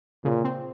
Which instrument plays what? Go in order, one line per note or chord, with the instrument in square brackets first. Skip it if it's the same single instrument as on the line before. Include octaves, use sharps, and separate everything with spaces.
[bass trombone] A#2 [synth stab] C#3
[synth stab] C4